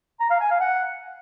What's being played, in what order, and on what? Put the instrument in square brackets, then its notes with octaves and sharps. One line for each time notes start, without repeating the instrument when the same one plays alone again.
[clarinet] A#5
F5
G#5
F5
F#5